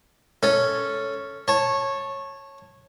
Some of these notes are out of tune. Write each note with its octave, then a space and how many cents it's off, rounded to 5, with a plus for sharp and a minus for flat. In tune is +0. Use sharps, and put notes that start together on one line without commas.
C#4 +0 A4 +0
C#5 -15 A5 +0